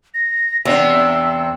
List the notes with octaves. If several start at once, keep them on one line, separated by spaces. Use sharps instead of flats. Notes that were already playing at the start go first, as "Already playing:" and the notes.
A#6
E2 C3 C4 D4 E6